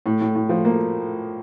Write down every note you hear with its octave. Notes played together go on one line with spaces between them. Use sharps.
A2
A2
A2
F3
A#3